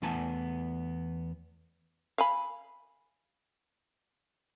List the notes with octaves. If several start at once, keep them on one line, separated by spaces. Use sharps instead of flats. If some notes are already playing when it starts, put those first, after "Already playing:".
E2 E3 A3 B3 G#5 A5
F5 G#5 B5